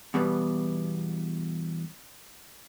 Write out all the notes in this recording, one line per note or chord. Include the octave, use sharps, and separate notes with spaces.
E2 B2 G3 B3